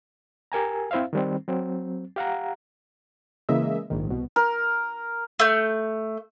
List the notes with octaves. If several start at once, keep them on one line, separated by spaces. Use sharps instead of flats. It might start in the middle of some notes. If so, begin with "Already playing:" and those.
G4 A#4 G#5 A#5
C4 E4 C5 E5 F5
D#3 G3 C4
F#3 C4
G4 F5 F#5 A#5
C#3 E3 G#3 A#3 D#5 E5
A#1 G#2 D#3
C2 B2
A#4
A3 G6